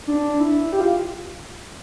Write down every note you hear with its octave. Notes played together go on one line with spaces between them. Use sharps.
D4
E4
G4
F4